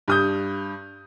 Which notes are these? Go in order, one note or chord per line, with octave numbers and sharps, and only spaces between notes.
G2 D#6 G6